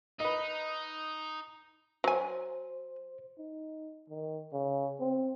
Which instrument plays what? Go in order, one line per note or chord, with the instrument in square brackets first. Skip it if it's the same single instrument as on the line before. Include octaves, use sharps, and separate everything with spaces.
[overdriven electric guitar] D#4 [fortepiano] B4 D#5
[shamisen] F#3 G#5 [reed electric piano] C5
[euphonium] D#4
D#3
C#3
C4